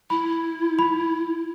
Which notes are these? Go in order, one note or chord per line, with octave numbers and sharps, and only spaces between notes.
E4 B5
B5